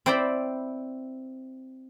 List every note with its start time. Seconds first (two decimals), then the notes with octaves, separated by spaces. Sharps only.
0.06 C4 E4 C5 D5 G5 B5